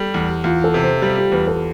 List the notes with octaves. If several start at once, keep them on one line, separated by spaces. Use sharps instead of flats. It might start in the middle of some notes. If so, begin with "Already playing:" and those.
Already playing: G3 G4 A4
E2
E2 F4
A4
C3
C5
G3 C5
G4
E2 B4
A4